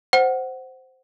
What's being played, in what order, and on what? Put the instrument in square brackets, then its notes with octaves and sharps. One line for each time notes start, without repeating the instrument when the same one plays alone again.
[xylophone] C5 F#5